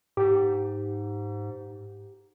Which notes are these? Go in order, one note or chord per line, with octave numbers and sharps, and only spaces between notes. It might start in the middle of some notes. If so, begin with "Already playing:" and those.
G#2 G4